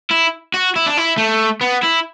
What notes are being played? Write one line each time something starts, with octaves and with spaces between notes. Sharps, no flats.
E4
F#4
E4
D4
E4
A3
B3
E4